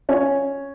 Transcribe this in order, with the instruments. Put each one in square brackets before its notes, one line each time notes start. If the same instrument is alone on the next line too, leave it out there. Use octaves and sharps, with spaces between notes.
[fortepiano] C#4 C#5